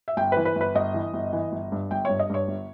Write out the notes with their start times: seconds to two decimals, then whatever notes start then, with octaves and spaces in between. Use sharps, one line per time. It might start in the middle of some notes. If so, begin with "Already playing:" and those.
0.08 E5
0.17 G1 G5
0.32 B4
0.37 E3
0.45 B4
0.55 G1
0.61 B4
0.75 G1 D#5
0.94 E3
1.13 G1
1.33 E3
1.52 G1
1.72 G2
1.91 G1 G5
2.05 G2 C#5
2.19 D#5
2.30 G2 C#5
2.48 G1